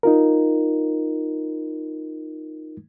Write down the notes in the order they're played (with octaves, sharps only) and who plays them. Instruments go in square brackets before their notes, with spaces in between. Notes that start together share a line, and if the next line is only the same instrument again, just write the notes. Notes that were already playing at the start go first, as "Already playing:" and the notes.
[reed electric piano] D#4 F4 A#4